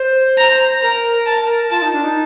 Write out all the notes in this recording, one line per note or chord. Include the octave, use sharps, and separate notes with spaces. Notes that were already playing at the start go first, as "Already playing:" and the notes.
Already playing: C5
A#5
A#4 A#5
A5
F4 A5
D#4
D4
D#4